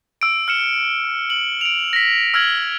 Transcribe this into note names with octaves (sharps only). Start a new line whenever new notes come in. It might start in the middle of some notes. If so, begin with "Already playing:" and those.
E6 D7
F6 C#7 E7
F#7
D7 F7
A#6 B6
E6 F6 G#6 F#7